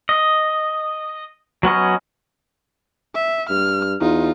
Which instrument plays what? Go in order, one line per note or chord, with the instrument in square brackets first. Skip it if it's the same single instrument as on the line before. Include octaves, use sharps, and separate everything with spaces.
[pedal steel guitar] D#5
F#3 B3 C#4 D#5
[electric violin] E5
[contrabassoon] G2 [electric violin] F6
[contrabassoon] E2 [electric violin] D#4 F4